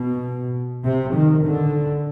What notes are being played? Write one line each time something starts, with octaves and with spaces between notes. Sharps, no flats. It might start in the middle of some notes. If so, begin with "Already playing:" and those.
Already playing: B2
C3
D#3
D3